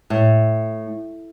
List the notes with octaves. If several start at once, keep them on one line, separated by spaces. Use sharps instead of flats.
A2